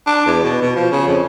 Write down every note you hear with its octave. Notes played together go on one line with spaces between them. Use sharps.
D4
E2
B2
B2
F3
C#3
F2